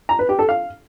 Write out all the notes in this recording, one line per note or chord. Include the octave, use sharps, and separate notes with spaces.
A#5
B4
G4
A4
F5